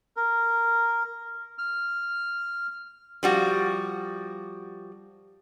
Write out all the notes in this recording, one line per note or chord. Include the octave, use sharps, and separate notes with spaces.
A#4
F6
F3 G3 F#4